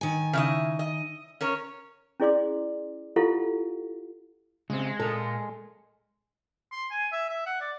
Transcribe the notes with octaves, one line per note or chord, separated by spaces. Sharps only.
D#3 G#5
C#3 E4 D#5
D#5
C#4 A#4 C#5
C#4 E4 G#4 D5 C6 D6
E4 F4 G4 A4 F5 F#5
C#3 G#3 C4
A#2 A4 A#4
C6
G#5
E5
E5
F#5
D5